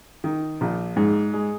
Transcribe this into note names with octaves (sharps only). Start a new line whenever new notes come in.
D#3
A#1
G#2
G#3